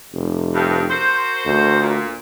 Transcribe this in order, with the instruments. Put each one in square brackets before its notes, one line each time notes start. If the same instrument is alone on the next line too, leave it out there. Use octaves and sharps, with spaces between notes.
[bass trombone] F1
[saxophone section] G2
F#4 A#4 C5
[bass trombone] D2
[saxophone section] A#2